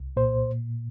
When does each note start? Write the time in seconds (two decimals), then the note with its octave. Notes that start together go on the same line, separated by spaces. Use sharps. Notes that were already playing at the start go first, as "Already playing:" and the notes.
Already playing: C2
0.16 A#2 C5